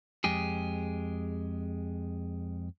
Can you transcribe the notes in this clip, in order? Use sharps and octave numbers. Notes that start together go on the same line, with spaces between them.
F2 G#3 G4 G#4